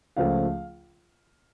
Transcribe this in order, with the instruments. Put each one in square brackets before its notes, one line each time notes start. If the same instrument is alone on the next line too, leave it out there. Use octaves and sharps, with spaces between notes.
[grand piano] C#2 C#3 F3 A3 F5